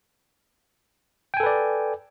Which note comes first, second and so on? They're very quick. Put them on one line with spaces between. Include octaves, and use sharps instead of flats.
G5 G#5 A4 B4 D5